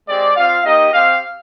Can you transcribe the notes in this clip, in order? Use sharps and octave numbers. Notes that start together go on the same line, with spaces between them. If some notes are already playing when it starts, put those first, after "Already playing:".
G#3 C4 G4 D5
C4 F4 F5
A#3 D#4 G4 D#5
C4 G4 F5